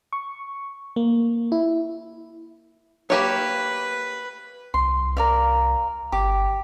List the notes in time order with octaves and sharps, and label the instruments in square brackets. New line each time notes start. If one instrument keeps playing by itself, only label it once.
[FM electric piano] C#6
A#3
E4
[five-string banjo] A#3 G4 C#5 [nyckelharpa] B4
[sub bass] C2 [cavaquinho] C6
[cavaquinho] A#4 D5 F5
[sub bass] G1 [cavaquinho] G4 D6